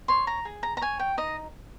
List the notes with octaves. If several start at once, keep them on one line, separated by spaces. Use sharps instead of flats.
C#5 C6
A#5
G#4
A#5
A#5
C#5 G#5
G5
D#4 D#5